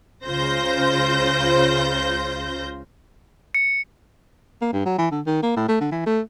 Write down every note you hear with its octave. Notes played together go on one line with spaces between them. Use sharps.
C#2 C#3 F4 C5 G6 A#6
C#7
A#3
G2
F#3
E3
D3
D#3
A#3
A2
A3
D3
E3
A3